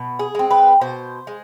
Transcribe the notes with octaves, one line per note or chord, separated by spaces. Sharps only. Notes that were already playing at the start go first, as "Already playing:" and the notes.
Already playing: B2
G#4
G#3 C4
B4
B2 C5
G#3